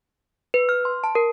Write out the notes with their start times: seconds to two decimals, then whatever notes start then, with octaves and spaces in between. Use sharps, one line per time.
0.54 B4
0.69 F6
0.85 C6
1.04 A5
1.15 A#4